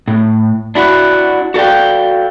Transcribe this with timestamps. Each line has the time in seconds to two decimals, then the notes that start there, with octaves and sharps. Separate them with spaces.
0.08 A2
0.75 D4 E4 F#4
1.54 F#4 A4 D5 F5 G5